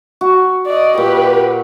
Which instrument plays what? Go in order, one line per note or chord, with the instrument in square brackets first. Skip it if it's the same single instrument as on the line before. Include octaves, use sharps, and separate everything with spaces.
[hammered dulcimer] F#4
[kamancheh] D5 D#5
[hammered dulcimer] A#2 [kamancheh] G4 B4